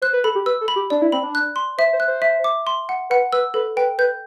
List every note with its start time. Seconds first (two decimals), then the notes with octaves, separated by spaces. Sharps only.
0.02 C5 F#6
0.13 B4
0.24 A4 B5
0.35 G4
0.46 B4 E6
0.61 A4
0.68 B5
0.76 G4
0.90 D4 D5
1.02 E4
1.12 C4 B5
1.23 D4
1.35 F#6
1.56 C6
1.78 C5 E5
1.93 C5
2.00 F#6
2.08 C5
2.22 E5
2.44 D6
2.67 C6
2.89 F#5
3.10 B4 F#5
3.32 B4 E6
3.54 A4 B4
3.76 B4 G5
3.98 B4 G6